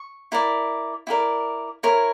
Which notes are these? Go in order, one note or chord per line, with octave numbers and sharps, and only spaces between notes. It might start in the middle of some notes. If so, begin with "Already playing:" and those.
Already playing: C#6
E4 A#4 D5
E4 G4 A#4 D5
E4 A#4 C#5